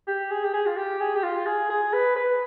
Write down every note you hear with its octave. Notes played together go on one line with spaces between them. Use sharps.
G4
G#4
G4
G#4
F4
G4
G#4
G4
F4
G#4
G#4
B4
B4